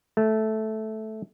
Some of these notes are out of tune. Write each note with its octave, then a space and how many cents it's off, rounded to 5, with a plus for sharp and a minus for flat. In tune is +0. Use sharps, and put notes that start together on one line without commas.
A3 -10